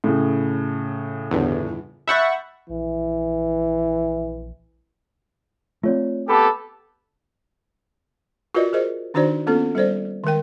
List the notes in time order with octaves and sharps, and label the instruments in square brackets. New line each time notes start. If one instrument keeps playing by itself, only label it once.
[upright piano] A2 C#3
[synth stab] G1 E2
[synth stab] E5 F#5 C#6 [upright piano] B5 G6 A6
[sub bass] A#1 [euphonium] E3
[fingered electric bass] A3 C4 [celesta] F4 C#5 D5
[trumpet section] B3 G4 A4 [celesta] A5 B5 D6
[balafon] F4 F#4 A#4 B4 D5 D#5
G#4 A#4 C5 D#5
D#3 D4 D#4 F#4 C5 D5
A#3 B3 C#4 F4 A4
G3 A4 C5 D5
D#3 G#3 A#4 G5